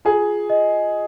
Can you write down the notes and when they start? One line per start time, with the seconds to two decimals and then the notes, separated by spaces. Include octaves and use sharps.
0.05 F4 G#4
0.50 D#5